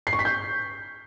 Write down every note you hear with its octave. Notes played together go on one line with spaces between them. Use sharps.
C7
C#6
B6
G6